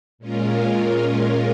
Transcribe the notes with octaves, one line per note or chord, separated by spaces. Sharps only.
A#2 G#3 C#4 F4 A#4